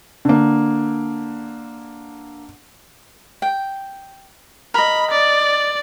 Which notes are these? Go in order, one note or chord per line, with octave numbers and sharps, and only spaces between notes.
D3 A#3
G5
A#4 D#5 B5
D5